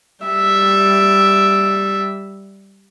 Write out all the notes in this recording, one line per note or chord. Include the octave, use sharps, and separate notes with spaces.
G3 E5